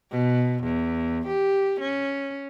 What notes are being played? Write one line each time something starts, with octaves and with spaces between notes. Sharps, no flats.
B2
E2
G4
C#4